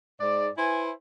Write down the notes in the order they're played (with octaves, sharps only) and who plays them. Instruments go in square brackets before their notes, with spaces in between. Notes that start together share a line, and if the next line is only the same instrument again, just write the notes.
[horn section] G#2 D5
E4 B4 C5 G#5